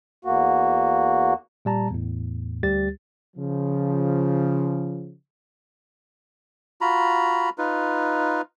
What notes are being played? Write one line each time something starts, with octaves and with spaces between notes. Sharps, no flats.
E2 A#3 F#4
A#2 G3 A5 A#5
E2 A2
D2 G3 G4 A6
C#3 F3
F4 F#4 A#5 B5
D#4 F4 B4